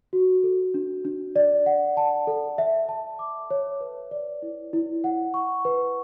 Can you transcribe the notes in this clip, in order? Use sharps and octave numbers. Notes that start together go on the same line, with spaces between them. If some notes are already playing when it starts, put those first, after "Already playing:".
F#4
A4
D4
D4
D5
F#5
A5
A4
E5
A5
D6
C#5
B4
D5
E4
E4
F#5
C#6
B4